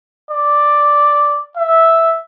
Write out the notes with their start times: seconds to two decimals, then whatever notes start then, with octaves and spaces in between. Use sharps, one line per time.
0.31 D5
1.57 E5